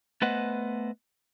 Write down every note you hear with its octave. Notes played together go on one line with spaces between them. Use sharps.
A3 B3 B4 C5 D#5 F#5